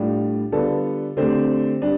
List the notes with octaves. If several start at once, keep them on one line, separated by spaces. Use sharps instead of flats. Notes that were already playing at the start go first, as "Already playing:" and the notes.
Already playing: A2 G3 D4 F4
D3 G3 B3 F4 A4
D3 A3 C4 G4 C5
G3 D4